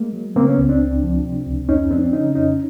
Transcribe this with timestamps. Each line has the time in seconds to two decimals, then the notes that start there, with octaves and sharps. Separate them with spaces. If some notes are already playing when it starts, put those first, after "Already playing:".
Already playing: G#3 A#3
0.13 F#3
0.36 C#3 A#3 C4
0.46 B3 C#4
0.58 C#2
0.69 C4 D4
0.81 C#2
1.03 F3
1.24 C3
1.46 C#2
1.68 F2 C#4 D#4
1.91 F3 C4 D4
2.13 C#3 C#4 D#4
2.35 F2 C#4 D#4